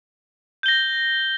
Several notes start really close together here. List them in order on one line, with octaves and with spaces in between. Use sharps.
G6 G7 A#6